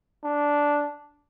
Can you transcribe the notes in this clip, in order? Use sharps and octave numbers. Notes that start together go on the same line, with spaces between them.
D4